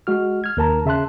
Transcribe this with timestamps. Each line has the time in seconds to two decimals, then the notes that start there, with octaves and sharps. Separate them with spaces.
0.07 G#3 F#4 F6
0.44 F6 G#6
0.57 D#2 A#4 A5 A#5
0.86 C#3 E5 A5 C6 F#6